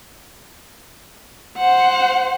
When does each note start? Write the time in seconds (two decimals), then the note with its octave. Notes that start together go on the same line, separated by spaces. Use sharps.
1.57 C5 F#5